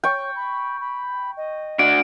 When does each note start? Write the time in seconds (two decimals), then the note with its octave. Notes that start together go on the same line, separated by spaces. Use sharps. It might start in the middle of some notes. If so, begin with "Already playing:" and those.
0.04 C#5 G5 C#6
0.36 B5
0.80 B5
1.37 D#5
1.79 D4 F#4 D7